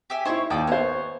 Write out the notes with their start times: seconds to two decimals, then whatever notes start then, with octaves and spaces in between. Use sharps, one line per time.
0.10 G4 E5 G#5
0.25 D#4 E4 C5 C#5
0.50 D#2 D5 D#5 G5
0.67 B3 C5 C#5